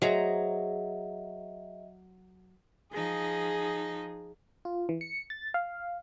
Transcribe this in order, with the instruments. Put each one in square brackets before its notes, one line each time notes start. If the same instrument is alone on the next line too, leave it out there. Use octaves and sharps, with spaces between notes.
[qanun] F#3 A#5 [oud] G#4 C5 [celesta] D#5 E5
[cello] F3 D#4 [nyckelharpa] G#4
[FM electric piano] F4
E3
C#7
A6
F5